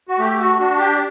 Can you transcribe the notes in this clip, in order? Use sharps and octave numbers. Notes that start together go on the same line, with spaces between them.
F#4
A3 G4
F#4
D4 F#4
G4